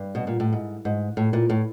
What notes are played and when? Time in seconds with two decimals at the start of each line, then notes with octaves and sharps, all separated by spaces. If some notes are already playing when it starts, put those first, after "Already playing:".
Already playing: G2
0.15 B2
0.27 A#2
0.40 A2
0.53 G#2
0.85 G#2
1.17 A2
1.33 A#2
1.50 A2